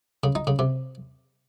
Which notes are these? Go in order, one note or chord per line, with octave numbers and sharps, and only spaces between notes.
C#3
D#4
C#3
C3